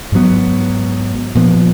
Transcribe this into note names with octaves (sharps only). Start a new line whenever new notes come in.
G#2 F#3 B3
A#2 F3 B3